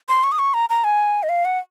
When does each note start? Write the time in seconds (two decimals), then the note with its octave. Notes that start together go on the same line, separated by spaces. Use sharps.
0.09 C6
0.24 C#6
0.32 D#6
0.39 C#6
0.54 A#5
0.70 A#5
0.84 G#5
1.23 D#5
1.29 F5
1.45 F#5